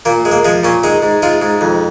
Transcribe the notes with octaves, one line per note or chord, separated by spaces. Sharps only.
A#2 A#3
G#3
A#3
F3 G#3
A#2 C#4
G#3 D#4
G#2
G#3 F4
G#2
F2